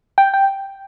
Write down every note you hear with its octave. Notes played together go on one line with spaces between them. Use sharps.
G5
G5